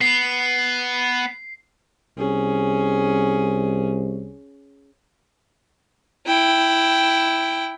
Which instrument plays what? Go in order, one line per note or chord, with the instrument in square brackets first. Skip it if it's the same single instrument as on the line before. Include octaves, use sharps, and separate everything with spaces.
[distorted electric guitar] B3 [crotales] C7
[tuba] C2 [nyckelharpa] C#4 G#4
[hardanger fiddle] E4 G5